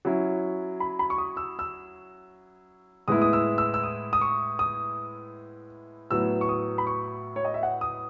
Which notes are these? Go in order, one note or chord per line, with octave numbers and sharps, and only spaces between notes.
F#3 C#4 E4
B5
B5
C#6
D#6
E6
E6
A2 G#3 B3 E4 D#6
D#6
E6
E6
E6
D#6
D#6
C#6
D#6
A2 F#3 B3 E6
C#6
D#6
B5
C#6
C#5
D#5
E5
F#5
D#6